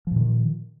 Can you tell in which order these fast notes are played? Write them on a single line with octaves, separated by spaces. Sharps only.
F3 A#2 D#3